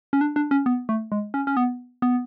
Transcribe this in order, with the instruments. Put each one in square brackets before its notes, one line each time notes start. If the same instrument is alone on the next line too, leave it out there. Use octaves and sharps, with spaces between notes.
[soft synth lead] C#4
D4
D4
C#4
B3
A3
G#3
C#4
C#4
B3
B3